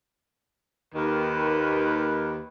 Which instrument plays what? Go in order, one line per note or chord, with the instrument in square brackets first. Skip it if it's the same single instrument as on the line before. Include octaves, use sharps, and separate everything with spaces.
[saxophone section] D#2 D#3 [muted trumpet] B4